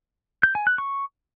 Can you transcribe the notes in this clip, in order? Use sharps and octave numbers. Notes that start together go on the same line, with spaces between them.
G6
G#5
F#6
C#6